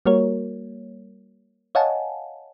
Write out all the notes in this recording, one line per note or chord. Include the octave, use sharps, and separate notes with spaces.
G3 A#3 F#4 A#4 C#5
C#5 D#5 F5 F#5 G#5 A5